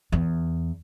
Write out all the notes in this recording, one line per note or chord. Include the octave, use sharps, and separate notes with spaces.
E2